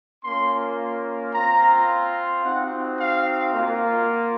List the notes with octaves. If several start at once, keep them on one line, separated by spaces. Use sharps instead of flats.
A#3 C#4 F4 C6
C4 F4 A#5
C4 D#4 F#4 F#5
F5
A#3 F4